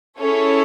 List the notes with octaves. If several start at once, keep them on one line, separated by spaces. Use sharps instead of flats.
C#4 E4 G#4 A4 C#5